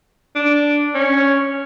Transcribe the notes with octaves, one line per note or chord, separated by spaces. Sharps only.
D4
C#4